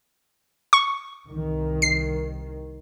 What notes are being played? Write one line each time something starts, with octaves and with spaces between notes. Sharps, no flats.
C#6
C2 D#3
C7